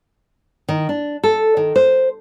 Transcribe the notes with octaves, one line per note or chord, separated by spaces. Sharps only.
D#3
D4
A4
D#3
C5